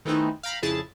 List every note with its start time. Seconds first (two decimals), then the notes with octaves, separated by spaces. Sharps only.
0.05 D#3 E3 A3 B3 C4 D#4
0.43 F5 G5 A#5 B5
0.62 F2 C#3 E4 G#4 A5 A6